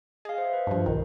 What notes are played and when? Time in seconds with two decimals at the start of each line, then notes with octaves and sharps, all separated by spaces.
0.25 G#4 D#5 F5
0.38 C5 E5
0.53 B4
0.67 G2 F3
0.86 B1 D#3